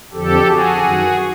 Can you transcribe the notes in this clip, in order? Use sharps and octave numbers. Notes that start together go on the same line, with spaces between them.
F2 D3 F3 G4 A4
F#4 G#4
F#2 D#3